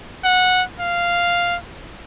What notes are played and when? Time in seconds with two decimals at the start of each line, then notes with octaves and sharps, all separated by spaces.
0.24 F#5
0.80 F5